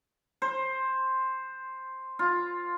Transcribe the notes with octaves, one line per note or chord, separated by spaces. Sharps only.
C5
F4